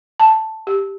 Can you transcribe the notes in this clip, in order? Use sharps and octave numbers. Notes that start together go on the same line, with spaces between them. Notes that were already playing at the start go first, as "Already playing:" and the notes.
A5
G4